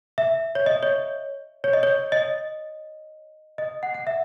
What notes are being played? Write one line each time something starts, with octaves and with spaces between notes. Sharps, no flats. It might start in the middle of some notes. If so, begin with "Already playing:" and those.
E5
C#5
D#5
C#5
C#5
D#5
C#5
D#5
D#5
F#5
F#5
E5